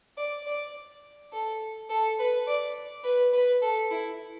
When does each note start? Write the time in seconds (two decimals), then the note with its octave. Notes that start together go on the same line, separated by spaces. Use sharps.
0.17 D5
0.46 D5
1.32 A4
1.90 A4
2.19 B4
2.47 D5
3.04 B4
3.33 B4
3.62 A4
3.91 E4